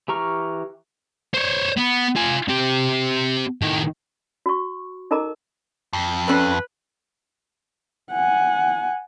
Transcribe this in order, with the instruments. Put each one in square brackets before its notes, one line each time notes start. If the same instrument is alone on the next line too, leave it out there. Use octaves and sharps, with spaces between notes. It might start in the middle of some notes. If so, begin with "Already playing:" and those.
[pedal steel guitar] E3 G4 A#5 C#6 F6
[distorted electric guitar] C5 C#5
B3
F4 G#5
C4 G4
A2 D#3
[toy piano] F#4 C#6
D#4 A4 A#4 D#5 A#5 D6
[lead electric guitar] F2
[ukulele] C#4 A4 D5 [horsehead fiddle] B4
[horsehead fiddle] F#5 G#5